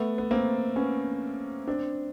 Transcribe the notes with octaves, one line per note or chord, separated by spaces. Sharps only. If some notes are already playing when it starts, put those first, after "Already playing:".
Already playing: A3 B3
B3
A#3 C4
B3 C#4
C4 D4